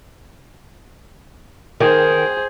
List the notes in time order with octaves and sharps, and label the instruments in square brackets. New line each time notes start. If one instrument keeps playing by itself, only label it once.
[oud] D#3 [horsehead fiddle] G#4 C5